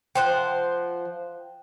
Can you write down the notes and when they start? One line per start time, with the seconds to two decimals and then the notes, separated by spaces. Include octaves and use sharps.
0.15 F3 C5 F#5 G5